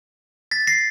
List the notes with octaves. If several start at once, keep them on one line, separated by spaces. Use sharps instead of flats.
A6 B6
A#6 C7